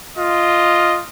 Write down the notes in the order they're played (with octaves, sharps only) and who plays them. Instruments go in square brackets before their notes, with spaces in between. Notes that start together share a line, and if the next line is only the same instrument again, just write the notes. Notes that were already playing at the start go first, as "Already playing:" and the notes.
[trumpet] F4 [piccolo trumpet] D#5